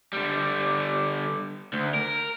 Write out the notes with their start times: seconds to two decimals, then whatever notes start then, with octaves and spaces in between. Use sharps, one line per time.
0.13 D3 G3
1.73 D2
1.94 A#4